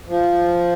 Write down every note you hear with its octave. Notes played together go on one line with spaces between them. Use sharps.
F3